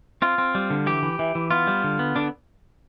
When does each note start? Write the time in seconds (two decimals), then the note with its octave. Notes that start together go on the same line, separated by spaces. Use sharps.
0.22 C4 F4
0.38 C4
0.55 G3
0.70 D3
0.86 E3 G4
1.02 E3
1.19 E3
1.35 E3
1.51 B3 F4
1.67 G3
1.84 D3
1.99 B3
2.16 D3 D4